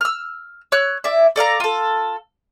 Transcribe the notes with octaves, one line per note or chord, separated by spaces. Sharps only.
E6 F6
C#5 E6 F#6
E4 D5 E5
A4 D5 F5 A#5
F4 A4